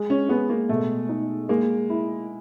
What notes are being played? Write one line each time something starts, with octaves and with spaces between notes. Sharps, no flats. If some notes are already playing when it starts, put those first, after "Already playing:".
Already playing: G#3
C#4
G#3 B3
A#3
B2 A3
D#4
G#3 A#3
E4